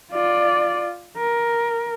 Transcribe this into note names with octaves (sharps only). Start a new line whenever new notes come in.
F4 D5
A#4